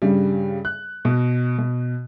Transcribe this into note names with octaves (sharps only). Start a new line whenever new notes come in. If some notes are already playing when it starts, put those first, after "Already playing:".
G2 C#3 G3
F#6
B2
B2